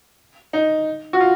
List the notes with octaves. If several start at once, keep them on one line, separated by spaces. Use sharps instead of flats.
D#4
F#4
F4